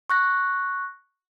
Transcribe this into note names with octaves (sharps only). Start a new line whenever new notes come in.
C#6 F#6 A#6